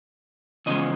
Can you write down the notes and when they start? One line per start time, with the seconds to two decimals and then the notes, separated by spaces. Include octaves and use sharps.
0.66 E2 C#3 F3 G#3 D#5